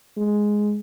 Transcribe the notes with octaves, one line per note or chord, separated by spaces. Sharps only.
G#3